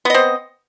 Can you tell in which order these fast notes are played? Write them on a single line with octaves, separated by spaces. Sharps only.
B3 D#5 C4